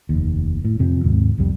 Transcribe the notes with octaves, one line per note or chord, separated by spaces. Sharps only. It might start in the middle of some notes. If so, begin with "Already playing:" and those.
F1 D#2
A2
F2 C3 F3
D#2 G#2 C3
C2 F2 G3